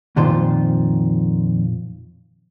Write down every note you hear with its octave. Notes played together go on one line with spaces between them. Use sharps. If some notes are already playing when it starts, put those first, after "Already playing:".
F2 A#2 D#3 F4 C5